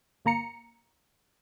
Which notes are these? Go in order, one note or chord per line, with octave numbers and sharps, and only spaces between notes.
G1 A#3 A#5 C#7